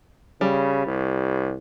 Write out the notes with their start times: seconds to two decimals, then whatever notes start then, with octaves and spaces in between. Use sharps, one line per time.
0.41 C#3 G3
0.87 C2